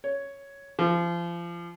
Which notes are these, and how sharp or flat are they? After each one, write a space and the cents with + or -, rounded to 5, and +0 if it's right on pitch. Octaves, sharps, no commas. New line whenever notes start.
C#5 +5
F3 -30